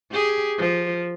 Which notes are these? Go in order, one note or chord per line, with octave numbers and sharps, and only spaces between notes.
G4 G#4
F3